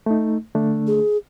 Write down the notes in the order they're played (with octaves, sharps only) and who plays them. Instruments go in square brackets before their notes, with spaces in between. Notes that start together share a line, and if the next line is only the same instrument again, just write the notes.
[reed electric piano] A3 D#4
D3 A3 D4
[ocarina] G#4